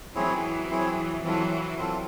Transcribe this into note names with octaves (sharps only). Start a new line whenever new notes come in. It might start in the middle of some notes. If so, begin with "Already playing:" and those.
E3 F#3 C4 E4 G#4 C#5
C4 E4 G#4 C#5
E3 F#3 C4 F4 A4
C4 F4 A4